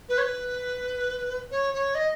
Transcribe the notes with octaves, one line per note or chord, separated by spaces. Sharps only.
B4
C#5
B4
C#5
C#5
D#5